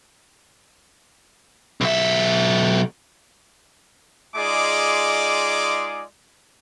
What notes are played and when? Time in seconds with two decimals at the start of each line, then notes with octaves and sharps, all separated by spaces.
1.81 B1 E5
4.36 G#3 D#4 F4 G#4 D5 D6